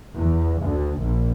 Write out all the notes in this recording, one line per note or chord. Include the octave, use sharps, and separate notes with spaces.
E2
D2
A#1